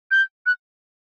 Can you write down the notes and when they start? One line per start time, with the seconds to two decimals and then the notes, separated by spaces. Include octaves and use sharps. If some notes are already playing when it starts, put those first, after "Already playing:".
0.11 G6
0.46 F#6